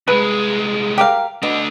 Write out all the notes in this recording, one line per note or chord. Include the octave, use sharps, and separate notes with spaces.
C2 G#3 B4
G4 A#4 F5
B2 A3 D4